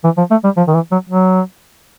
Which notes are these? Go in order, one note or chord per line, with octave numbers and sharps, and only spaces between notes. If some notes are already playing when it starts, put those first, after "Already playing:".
E3
F3
A3
G3
F3
D#3
E3
F#3
F#3